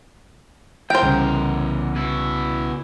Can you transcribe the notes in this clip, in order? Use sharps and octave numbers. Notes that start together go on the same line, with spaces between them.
E2 A#4 C5 G5
C2 C#3
B2 E4